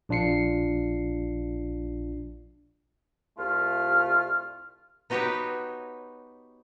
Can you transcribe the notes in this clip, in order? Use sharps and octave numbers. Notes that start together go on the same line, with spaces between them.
A#1 D4 F4 C7 C#7
C2 A3 F4 F6
B3 D#4 F#4 G4 B4 C#5